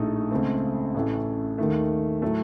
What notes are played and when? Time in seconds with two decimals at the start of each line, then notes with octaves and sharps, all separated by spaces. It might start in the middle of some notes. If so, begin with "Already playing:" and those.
Already playing: A#1 A2 A3 D#4
0.31 C#2 C#3 A3 C4
0.95 A1 A2 A3
1.58 D#2 D#3 A3
2.22 A2 F#3 A3